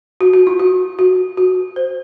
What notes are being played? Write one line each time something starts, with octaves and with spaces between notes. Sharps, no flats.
F#4
F#4
F4
F#4
F#4
F#4
C5